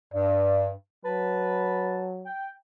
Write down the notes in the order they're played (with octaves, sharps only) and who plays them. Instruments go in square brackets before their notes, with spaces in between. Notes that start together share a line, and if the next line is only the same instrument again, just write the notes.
[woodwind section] G2 [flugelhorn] D5
[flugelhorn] F#3 [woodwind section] B4 A5
[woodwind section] G5